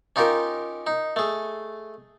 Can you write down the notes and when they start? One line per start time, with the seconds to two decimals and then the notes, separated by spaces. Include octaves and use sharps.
0.16 C#4 D#4 F4 G4 A#4
0.87 D#4
1.16 A3 G#4